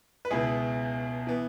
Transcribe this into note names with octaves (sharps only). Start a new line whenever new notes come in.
B4
C#2 B2 B3 E4 G#4
E3 B3